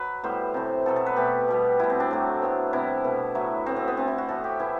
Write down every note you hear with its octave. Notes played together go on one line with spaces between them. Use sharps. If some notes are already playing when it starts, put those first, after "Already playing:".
Already playing: F#3 B4
A2 G3 B3 C5
C3 E3 A3
B2 F#3 B3 A4
A4
B4
B2 A3 G4
B2 G3 B3
B2 G3 B3 E4
C4
D4
A2 F#3 A3
A2 F#3 B3
C3 G3 B3 E4
B2 A3
A2 F#3 A3 E4
A2 F#3 B3 C4
C4
B3
D3 A3 C4
E4
F#4
A2 E3 B3 A4
G4
A2 E3 A3 E4